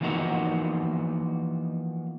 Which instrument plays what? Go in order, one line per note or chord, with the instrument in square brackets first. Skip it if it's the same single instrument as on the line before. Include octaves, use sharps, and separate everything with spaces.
[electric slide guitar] E3 F3 A#3 B3 D#4 F#4